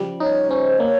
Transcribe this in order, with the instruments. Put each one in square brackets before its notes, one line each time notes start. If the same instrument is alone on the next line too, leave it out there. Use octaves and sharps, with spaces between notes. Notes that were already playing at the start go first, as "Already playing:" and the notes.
Already playing: [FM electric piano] C#3 F3 G3
[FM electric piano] D#4 [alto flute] C#5
[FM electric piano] C#4 [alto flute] C5
[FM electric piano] A#3 [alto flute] C#5